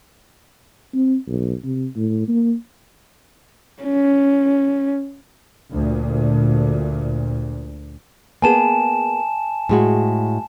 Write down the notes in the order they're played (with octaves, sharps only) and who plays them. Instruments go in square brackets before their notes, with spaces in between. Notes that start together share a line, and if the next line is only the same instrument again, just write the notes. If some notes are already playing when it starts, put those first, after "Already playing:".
[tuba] C4
B1
C3
A2
A#3
[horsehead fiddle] C#4
[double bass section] D2 A#2
[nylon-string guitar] A#3 B3 G#4 [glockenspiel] G#5 A5 E7
[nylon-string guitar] A2 G#3 F#4